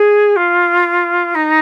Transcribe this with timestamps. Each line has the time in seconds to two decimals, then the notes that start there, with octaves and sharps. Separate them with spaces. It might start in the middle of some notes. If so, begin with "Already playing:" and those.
Already playing: G#4
0.36 F4
1.34 D#4